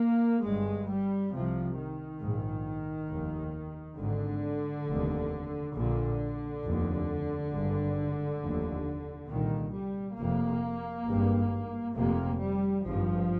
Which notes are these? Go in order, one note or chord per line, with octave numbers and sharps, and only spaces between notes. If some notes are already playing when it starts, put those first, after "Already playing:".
Already playing: A#3
G1 G2 G#3
G3
C2 C3 F3
D#3
A#1 G#2
F1 D#2
G#1 G#2 D3
F1 D#2
A#1 A#2 D3
F1 D#2
G#1 G2
F1 D#2
C2 A#2 D#3
G3
F1 F2 C3 A#3
G#1 G2
F1 F2 C3 A#3
G3
G#1 G2 F3